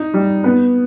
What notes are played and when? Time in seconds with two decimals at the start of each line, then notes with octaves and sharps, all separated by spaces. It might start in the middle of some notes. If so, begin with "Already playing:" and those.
Already playing: D#4
0.14 G3
0.44 B3